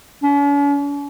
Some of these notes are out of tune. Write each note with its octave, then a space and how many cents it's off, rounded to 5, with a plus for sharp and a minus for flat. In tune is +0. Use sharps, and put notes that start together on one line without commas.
C#4 +45